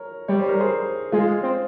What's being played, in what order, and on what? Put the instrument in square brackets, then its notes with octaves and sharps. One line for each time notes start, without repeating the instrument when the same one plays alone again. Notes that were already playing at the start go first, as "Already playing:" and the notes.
Already playing: [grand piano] A#4 C#5
[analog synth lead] G3 [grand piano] C#5
[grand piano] C5
A#4
G#4 C5
[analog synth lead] G#3 [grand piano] F4 G#4
[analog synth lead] C4